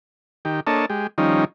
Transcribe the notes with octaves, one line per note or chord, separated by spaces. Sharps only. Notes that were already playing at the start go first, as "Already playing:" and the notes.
D#3 G4
A#3 D4 A4 C#5 D#5 A5
G#3 G4
D#3 F3 G3 C#4 D#4